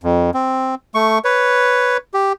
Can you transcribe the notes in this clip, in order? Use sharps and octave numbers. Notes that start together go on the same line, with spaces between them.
F2
C4
A3 C#6
B4 C#5
G4